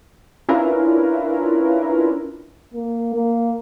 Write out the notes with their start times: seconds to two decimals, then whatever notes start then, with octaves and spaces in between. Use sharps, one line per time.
0.49 C#4 D4 E4 F4 A#4 B4
2.74 A#3
3.14 A#3